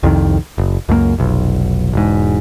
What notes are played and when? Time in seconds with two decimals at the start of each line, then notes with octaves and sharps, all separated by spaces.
0.03 C2 F2 D#3
0.58 F#1
0.89 C#2 F#2 A3 A#3
1.18 F1 B1
1.93 E1 G#2